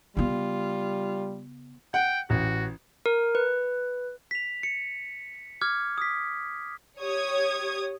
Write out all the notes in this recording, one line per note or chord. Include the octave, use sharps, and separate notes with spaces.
C#3 G3 B3 F4
F#5 G5
A1 F#4
A#4
B4
B6 F7
C#7
D6 F6 G#6
D#6 B6
G4 C#5 D#6 G#6